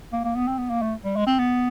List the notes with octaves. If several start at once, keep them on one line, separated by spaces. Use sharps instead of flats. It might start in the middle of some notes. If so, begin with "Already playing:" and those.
A#3
A#3
B3
C4
B3
A#3
A3
G3
G#3
C4
B3